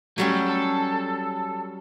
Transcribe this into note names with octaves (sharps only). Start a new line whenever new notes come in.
A2 F#3 G3 A3 C#4
A4